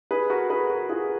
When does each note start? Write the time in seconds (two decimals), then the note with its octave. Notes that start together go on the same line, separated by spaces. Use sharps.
0.11 G#4 B4
0.30 F#4 A#4
0.50 G#4 B4
0.70 F#4 A#4
0.89 F4 G#4